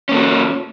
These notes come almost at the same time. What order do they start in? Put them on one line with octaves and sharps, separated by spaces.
C#4 A#3 A4 F#4